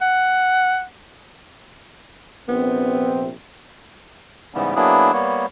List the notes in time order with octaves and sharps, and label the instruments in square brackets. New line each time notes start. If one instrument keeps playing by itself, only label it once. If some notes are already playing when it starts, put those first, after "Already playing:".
[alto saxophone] F#5
[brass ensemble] A#1 C3 C4 [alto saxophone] B3
[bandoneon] G#2 C#3 E3 G3 B3
F#3 A#3 B3 D4 E4 G#4
G3 A#3 B3 C#5